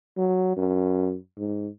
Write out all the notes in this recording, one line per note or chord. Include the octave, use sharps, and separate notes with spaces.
F#3
F#2
G#2